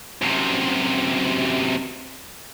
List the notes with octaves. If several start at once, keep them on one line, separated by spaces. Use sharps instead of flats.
F#2 C3